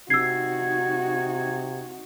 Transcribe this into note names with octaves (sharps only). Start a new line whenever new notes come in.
C3 D#4 F#4 E6 G#6 C7